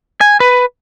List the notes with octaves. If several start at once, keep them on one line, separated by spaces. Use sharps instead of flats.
G#5
B4